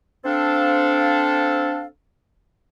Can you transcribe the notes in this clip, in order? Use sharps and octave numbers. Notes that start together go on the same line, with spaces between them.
C4 D4 A4 F5